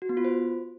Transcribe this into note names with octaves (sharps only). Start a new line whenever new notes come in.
F#4
B3
F4
C5